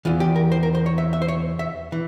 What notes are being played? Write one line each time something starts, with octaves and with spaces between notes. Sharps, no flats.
E2 E3 F4
G4
A#4
C5
A#4
C5
C#5
E5
E5
C5
C#5
E5
E3